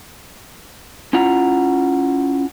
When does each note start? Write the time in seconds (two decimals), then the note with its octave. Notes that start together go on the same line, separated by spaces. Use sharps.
1.13 C#4 E4 F4 F#5 A#5